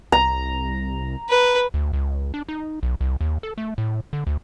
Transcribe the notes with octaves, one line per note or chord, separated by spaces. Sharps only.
C2 A#5
B4
D2
C#2
D4
D#4
B1
C2
D#2
A4
A3
A2
D3
D2